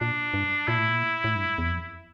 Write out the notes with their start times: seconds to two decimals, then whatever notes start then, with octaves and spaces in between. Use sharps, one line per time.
0.01 A#2 D4
0.34 G2
0.68 A#2 E4
0.78 A2
0.89 A#2
1.24 A2
1.35 G2
1.58 E2
1.69 F2